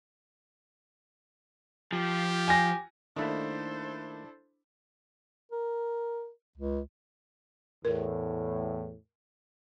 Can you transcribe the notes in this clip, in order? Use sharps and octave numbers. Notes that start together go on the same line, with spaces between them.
F3 G4
G#5 A#6
D#3 A3 A#3 D4 E4 A4 C5 B5
A#4
C#2
E2 A2 A#4